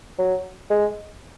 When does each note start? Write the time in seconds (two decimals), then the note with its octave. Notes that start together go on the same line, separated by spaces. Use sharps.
0.19 F#3
0.70 G#3